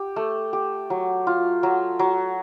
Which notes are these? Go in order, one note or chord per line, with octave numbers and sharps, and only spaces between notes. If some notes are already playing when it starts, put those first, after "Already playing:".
Already playing: G4
A3
G4
F#3
F4
F#3
F#3